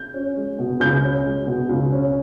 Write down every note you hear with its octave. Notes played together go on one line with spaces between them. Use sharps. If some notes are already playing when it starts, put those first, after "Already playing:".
Already playing: G6
C#4
G#3
B2
C#2 G6
C#4
G#3
B2
C#2
C#4